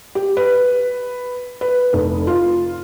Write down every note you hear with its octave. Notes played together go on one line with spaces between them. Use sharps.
G4
B4
B4
F1
F4